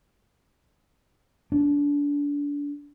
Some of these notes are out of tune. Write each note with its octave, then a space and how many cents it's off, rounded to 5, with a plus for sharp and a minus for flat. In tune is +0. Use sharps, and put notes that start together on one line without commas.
D4 -30